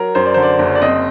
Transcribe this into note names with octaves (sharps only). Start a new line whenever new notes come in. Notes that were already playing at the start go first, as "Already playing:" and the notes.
Already playing: F#3 A#4
F#2 C5
D5
D3 C5
D5
F#1
D5
C4 D#5